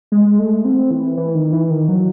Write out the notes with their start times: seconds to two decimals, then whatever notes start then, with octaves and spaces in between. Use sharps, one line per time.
0.12 G#3
0.39 A3
0.65 C4
0.91 E3
1.17 E3
1.35 D#3
1.53 E3
1.71 D#3
1.89 F#3